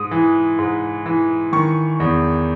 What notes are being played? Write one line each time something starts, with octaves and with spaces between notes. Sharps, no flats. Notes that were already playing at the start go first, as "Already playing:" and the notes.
Already playing: G#2 D#6
E3
G#2
E3
D#3 C#6
E2